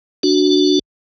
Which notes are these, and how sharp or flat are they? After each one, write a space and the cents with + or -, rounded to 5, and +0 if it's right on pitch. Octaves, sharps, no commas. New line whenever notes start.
D4 +0 F#4 +0